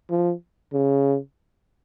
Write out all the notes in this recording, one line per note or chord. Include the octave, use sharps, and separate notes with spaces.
F3
C#3